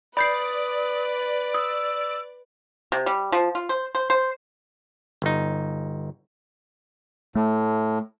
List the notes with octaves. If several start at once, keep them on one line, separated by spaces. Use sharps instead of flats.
B4 D5 B5 D#6 G6 C7
D#6 E6
C3
G3
F3
F4
C5
C5
C5
G1 D#4
A2 A3